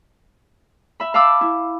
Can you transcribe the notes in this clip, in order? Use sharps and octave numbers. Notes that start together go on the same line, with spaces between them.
E5 B5
F5 A5 B5 D6 E6
E4